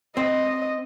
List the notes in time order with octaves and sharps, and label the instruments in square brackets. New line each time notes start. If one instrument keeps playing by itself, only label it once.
[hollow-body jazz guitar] C4 [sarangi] D#5